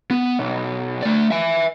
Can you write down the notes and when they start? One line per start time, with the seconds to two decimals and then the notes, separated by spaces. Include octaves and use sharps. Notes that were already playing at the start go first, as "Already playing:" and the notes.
0.11 B3
0.39 B1
1.03 A3 D5
1.31 E5 G#5